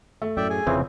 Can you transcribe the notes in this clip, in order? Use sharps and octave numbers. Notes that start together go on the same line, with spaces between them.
A3
F#2 A2 D5 E5 G5
G#4 G#5
F1 F2 C#3 E3 C4